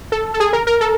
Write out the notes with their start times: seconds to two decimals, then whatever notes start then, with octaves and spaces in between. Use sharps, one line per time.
0.12 A4
0.34 A4
0.40 G#4
0.53 A#4
0.67 A#4
0.81 A4